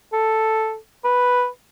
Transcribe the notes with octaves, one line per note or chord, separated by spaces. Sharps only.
A4
B4